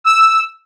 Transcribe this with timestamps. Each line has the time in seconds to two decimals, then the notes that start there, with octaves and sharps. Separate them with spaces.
0.04 E6